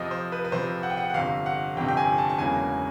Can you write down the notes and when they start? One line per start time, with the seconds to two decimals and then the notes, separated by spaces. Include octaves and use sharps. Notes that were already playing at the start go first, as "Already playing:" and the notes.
Already playing: F2 C3 F3 D#5
0.11 C5
0.32 B4
0.45 B4
0.52 F2 C3 F3 C5
0.83 F#5
0.90 G5
0.97 F#5
1.10 F#5
1.14 G1 F2 C3 F5
1.46 F#5
1.76 G1 F2 C3 G5
1.88 G5
1.97 G#5
2.18 A5
2.29 A5
2.38 E1 E2 C#3 F#3 A#3 G#5